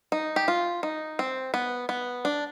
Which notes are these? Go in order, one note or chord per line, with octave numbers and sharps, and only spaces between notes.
D#4
G4
F4
D#4
C4
B3
B3
D4